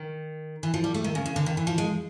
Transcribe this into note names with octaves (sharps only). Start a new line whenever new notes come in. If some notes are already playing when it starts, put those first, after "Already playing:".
Already playing: D#3
E3
F3
G3
A3
D#3
C#3
C#3
D3
D#3
E3
F3
G#3